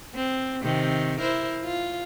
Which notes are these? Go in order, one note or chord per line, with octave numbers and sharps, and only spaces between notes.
C4
C3 D#3 C4
E4 A#4 C5
F4